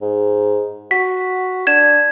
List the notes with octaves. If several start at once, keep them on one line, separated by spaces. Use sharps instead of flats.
G#2
F#4 B6
D4 G#6 E7